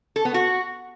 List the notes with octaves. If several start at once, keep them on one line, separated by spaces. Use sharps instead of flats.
A4
B3
F#4